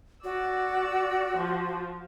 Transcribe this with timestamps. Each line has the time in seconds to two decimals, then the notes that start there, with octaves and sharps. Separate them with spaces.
0.24 F#4 D5 E6
1.38 F3